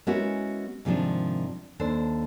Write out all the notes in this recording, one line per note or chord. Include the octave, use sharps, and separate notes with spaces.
G#3 B3 C#4 E4 F#4 A#4
G#2 C3 D#3 F3 D4
D#2 D4 A4 C5